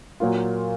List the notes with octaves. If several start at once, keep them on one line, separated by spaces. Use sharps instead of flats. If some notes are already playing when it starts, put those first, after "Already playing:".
A#2 F#3 A#3 F4